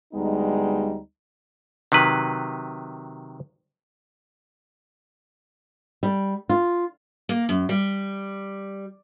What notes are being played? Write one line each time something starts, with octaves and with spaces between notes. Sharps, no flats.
D2 G3 G#3 B3 D#4
C3 D#3 F#3 B4
G3
F4
A#3
F#2
G3